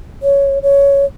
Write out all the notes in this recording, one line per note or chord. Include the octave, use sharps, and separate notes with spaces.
C#5
C#5